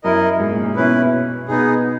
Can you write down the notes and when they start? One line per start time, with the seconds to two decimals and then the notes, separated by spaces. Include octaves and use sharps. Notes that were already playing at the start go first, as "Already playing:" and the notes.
0.04 F#2 E4 A#4 D#5
0.39 G#2
0.52 A#2
0.64 A#2
0.76 B2 C#4 E4 B4
1.48 B2 B3 D#4 G#4